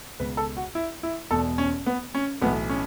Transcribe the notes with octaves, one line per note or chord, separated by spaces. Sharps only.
C#2 B2 B4
A4
F#4
E4
E4
E1 E2 B2 A4
C#4
B3
C#4
B1 A2 E3 B3
C#4